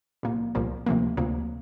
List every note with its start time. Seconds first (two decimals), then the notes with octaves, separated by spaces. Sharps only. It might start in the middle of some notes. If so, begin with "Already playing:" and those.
0.23 C2 A#2 F3 A#3
0.55 C2 A#2 F3 A#3
0.86 D2 C3 F3 A#3
1.17 D2 C3 F3 A#3